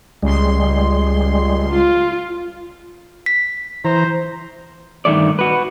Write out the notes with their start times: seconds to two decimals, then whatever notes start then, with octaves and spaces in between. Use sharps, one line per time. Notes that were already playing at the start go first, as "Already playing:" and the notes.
0.23 C#2 G3 G#3 C6
1.73 F4
3.26 B6
3.85 E3 C5 A#5
5.05 G2 D#3 E3 A3 D5
5.39 F#4 B4